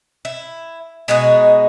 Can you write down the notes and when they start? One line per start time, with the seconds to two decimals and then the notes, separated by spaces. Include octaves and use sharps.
0.25 E4
1.08 B2 G#3 D#4 F#4